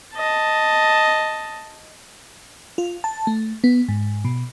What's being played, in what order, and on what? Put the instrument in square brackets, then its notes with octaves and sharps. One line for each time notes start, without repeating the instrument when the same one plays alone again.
[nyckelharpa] D#5 A5
[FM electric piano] F4
A5
A3
B3
G#2
B2